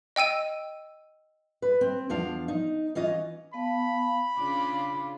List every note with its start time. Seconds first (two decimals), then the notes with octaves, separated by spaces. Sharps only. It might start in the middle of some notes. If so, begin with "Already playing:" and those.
0.16 D#5 G5 E6 D#7
1.62 B4
1.81 C4
2.09 E2 F3 D4 F5
2.48 D#4
2.95 E3 C#4 F4 D#5
3.54 B3 F5 A5 B5
4.37 C#3 D4 F4 D6